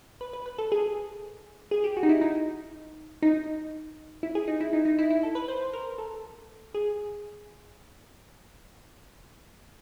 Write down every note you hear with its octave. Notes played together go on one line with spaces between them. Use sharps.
B4
B4
B4
A4
G#4
G#4
G4
F#4
D#4
E4
D#4
D#4
E4
G#4
D#4
E4
D#4
D#4
E4
E4
A4
B4
C5
B4
A#4
A4
G#4